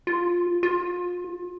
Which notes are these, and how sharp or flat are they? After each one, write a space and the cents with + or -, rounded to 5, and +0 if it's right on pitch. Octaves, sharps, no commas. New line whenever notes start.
F4 +10
F4 +30